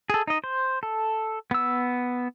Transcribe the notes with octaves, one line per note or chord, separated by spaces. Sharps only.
G#4 A4
D#4 D#5
C5
A4
B3 E6